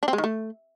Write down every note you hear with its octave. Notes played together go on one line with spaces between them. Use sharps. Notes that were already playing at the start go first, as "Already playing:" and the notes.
D4
C4
G#3
D#3
A3